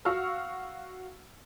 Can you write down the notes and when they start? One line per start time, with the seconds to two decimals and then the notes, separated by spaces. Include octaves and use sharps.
0.05 F#4 F5 F#5 C#6 E6 F6